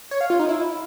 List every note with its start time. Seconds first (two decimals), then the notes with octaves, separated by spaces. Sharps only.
0.11 C#5
0.21 F5
0.30 F4
0.39 D#4
0.49 E4